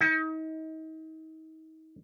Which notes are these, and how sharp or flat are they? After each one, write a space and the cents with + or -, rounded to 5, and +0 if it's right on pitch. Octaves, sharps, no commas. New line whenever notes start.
D#4 +35